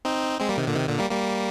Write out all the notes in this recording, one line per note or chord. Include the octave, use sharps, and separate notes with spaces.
C4 D#4
G#3 C4
G3 A#3
C3 D#3
A#2 D3
C3 D#3
A#2 D3
G3 A#3
G3 A#3